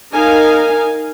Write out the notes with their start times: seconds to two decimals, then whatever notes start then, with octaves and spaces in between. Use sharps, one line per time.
0.13 D#4 A#4 F5 G#5